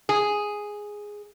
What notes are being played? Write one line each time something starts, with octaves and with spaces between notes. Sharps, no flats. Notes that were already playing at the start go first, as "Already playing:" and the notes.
G#4